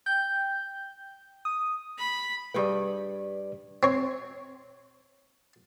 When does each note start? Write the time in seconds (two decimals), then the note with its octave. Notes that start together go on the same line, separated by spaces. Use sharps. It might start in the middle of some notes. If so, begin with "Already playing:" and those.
0.06 G5 G6
1.45 D#6
1.98 B5
2.54 G2 G#4 B4 D5 G5
3.83 C4 C#5